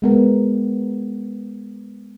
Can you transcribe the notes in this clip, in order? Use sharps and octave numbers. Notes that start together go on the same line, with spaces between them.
G#3 B3 A#4